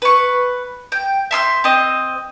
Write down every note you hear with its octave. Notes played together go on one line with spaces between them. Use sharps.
B4 C#6
G5
E5 C6 E6 G6
C4 D#5